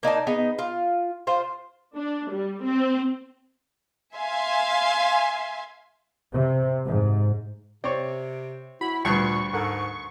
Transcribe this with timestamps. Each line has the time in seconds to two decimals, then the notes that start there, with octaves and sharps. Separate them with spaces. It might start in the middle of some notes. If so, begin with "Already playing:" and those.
0.03 A#3 D#4 D5 A5
0.27 B3 D#4 G#4
0.58 F4
1.27 F4 C5
1.95 D4
2.30 G3
2.63 C4
4.15 E5 F5 G#5 C6
6.32 C3
6.86 G#2
7.84 C3 C4 C#5 D5
8.81 E4 F#4 B5
9.05 D2 G2 A#2 G3 G5 C#6
9.53 G#2 A4 A#4 F#5